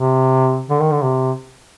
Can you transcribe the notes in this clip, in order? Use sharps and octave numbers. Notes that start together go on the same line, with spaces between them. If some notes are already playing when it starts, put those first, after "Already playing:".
Already playing: C3
D3
D#3
D3
C3